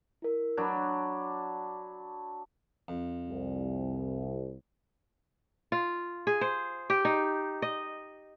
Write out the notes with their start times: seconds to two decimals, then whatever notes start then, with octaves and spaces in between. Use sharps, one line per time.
0.22 E4 A#4
0.57 F#3 D4 B5 G#6
2.88 F2
3.29 C2
5.72 F4
6.27 G#4
6.41 C5
6.90 G4
7.05 D#4
7.62 D#5